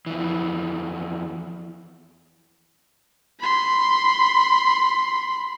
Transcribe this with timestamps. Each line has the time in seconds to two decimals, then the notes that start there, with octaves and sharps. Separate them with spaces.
0.06 F2 E3
3.40 B5 C6